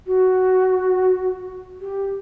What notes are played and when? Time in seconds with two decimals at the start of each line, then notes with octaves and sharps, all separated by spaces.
0.06 F#4
1.81 G4